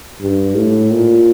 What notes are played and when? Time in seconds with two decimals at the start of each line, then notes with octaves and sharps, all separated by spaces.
0.21 G2
0.56 A2
0.91 A#2